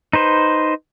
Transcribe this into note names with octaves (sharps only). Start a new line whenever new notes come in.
D#4 B4 C5